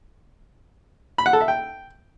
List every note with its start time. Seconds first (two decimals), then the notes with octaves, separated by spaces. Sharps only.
1.18 B5
1.26 F#5
1.33 A4
1.41 E5
1.48 G5